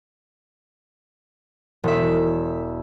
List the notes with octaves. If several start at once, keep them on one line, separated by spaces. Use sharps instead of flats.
E1 E5